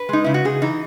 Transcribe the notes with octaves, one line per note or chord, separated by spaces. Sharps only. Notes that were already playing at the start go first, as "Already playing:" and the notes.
Already playing: B4
G#3 D#4
C#3 E4
F#4
C#3 G#4
E3 D#4